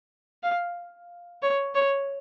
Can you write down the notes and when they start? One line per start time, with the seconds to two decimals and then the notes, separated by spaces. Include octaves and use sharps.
0.43 F5
1.42 C#5
1.74 C#5